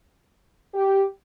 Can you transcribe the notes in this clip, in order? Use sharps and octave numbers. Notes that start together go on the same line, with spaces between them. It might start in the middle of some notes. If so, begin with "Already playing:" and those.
G4